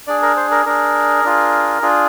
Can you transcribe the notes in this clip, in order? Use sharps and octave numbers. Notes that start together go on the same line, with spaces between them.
D4 G#4 D5
A#4
C5
A#4
D4 G#4 A#4
D4 F4 G#4
D4 F4 G#4